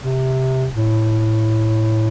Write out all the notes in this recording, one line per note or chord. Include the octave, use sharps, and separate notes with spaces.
C3
A2